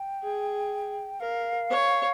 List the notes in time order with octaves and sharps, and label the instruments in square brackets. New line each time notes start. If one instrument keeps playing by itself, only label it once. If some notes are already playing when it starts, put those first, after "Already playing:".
Already playing: [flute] G5
[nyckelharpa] G#4
[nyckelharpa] A#4 [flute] F5
[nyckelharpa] C#5